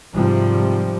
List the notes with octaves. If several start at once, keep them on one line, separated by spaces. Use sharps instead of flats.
G#2 C3 F3 G3